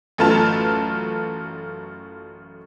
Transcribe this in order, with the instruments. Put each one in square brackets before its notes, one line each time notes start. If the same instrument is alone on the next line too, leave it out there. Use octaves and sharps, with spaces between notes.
[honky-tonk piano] A1 F#2 A3 F4 B4 A5